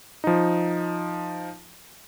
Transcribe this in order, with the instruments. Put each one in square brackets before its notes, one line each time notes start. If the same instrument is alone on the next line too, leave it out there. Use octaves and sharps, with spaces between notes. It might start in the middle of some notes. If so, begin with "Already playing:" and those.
[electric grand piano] F3 D#4